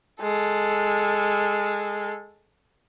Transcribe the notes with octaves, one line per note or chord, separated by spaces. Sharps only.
G#3 A4